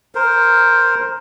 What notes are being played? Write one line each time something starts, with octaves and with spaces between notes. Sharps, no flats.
A#4 C5